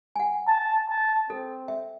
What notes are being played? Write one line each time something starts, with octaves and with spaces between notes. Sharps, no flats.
F#5 G#5
A5
A5
C4 A4
E5